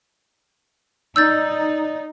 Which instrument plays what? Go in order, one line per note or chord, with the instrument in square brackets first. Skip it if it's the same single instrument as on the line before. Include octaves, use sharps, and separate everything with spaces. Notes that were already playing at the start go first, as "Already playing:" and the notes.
[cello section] D#4 [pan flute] D5 [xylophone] E6 G6 A6